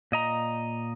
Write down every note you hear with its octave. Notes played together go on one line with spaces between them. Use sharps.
A#2 D#5 A#5